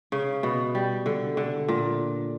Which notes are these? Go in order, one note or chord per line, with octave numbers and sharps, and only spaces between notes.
C#3
B2
G3
D3
D3
A#2